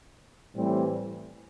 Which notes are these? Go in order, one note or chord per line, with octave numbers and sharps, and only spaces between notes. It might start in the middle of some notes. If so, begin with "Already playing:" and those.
A2 E3 G3 C4